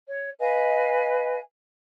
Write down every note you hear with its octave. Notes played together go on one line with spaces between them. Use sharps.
C#5
B4 D#5 F5 G#5